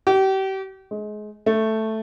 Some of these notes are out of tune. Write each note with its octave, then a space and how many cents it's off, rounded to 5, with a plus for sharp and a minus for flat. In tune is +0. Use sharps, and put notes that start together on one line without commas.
G4 -35
G#3 +25
A3 +0